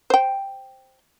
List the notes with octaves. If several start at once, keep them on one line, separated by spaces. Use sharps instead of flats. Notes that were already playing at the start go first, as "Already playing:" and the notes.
C5 G5